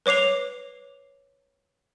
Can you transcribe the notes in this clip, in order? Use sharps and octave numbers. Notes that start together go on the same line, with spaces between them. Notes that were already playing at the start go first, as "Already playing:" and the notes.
B4 C#5 D6 C7 F7